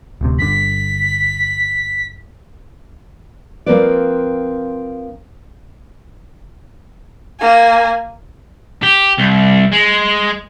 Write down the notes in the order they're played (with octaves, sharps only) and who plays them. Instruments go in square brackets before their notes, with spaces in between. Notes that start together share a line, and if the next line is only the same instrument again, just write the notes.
[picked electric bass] D1 D2 C3
[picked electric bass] G1 D3 [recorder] B6
[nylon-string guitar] F3 A#3 C4 F4 B4 D5
[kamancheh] A#3 G#5
[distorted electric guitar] G4
C2
G#3